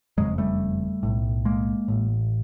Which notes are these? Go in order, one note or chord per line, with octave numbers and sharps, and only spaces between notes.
F#1 F2 C#3 F#3 G#3
G3 A3
B1 A2
G#3 A#3
A1 A2